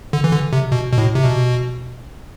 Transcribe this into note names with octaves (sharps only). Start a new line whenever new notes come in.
D3
E3
D3
C3
B2
B2
A2
C3
B2